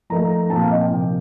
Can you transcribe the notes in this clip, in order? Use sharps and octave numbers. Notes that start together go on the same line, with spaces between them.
F3 A3 D#4 A#5
A#2 F3 C4 A5
F5
D#5
G5
C3 F3 A#3